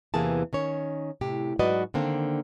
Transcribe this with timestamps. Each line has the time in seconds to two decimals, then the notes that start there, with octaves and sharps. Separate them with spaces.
0.14 E2 C3 E3 A#3 G#4 A5
0.53 D#3 C#4 C#5
1.21 A2 C3 G4
1.59 G#2 F#3 F#4 B4 D5 D#5
1.94 D3 D#3 A#3 C4 D4